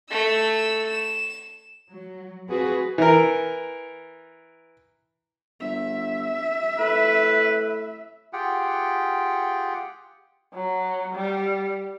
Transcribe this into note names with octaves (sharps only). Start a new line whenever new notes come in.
A3 E6
E7
F#3
C4 F4 F#4 G#4 B4
E3 A#4
G1 E5
A2 B4
F4 G4 G#4 F#5 G5
F#3
G3